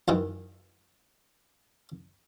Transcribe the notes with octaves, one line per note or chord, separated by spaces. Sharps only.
F#2 D#3 E3